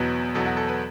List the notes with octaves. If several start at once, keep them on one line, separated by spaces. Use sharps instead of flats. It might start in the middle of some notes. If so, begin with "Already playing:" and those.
Already playing: E2 B2 F#3 B3
E2 B2 F#3 B3 A4
F#4
A4
B4